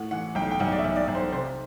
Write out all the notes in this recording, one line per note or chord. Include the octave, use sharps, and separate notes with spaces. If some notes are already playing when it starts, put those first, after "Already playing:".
Already playing: A2 F#5
E3 F#5
B1 G5
G5
B1 F#5
D5
E5
B1
D5
B1
C5
C3 C5